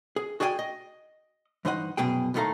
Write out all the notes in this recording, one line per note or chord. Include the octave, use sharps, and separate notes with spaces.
G#4
F#4 G#4 D5 D#5 G5 G#5
D#5
G2 E3 D#4 C5 D#5 F#5
C2 F#2 B2 G#4 G5
D#2 A2 D#3 A3 F5 A#5